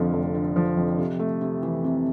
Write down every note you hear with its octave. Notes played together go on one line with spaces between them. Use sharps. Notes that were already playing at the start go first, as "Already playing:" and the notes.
Already playing: F1 F2 D3 F3
F1
D3
F3
F2
C3
A3
C3
E3
C3